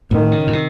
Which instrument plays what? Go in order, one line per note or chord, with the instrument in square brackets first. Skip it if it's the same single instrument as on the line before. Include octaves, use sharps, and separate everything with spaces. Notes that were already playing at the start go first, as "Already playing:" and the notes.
[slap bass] A2 [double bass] D#3
[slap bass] C#3
A2
C3